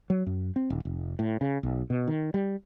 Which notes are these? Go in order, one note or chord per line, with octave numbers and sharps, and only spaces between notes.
F#3
F#2
C4
D#1
F1
A2
C#3
B1
B2
D#3
G3